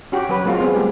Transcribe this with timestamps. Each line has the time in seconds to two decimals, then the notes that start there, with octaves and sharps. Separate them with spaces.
0.12 C#4 F#4 G4
0.29 F#3 C#4 B4
0.45 G#3 A#3 C4 F4 F#4 A#4
0.60 B3 C4 G#4
0.74 G3 A3 G4 G#4